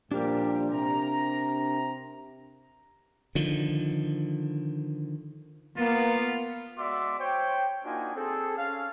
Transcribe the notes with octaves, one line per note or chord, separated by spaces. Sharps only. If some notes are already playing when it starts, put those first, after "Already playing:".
A#2 F3 G3 D4 G4 A#4
C3 A#5
D3 D#3 F3
A#3 B3 F4
G#3 F#4 D5 E5 C6 D6
C5 C#5 G5
A#3 D4 D#4 F4 F#4 G#5
C4 G#4 A4
C#4 F5